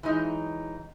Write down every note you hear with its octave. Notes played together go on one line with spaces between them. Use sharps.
E3 F#3 G#3 D#4